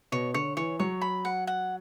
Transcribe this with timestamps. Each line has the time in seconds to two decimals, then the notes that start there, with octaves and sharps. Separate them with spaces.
0.12 B2 C#5
0.34 D3 C#5
0.57 E3 C#5
0.79 F#3 C#5
1.01 B5
1.25 F#5
1.47 F#5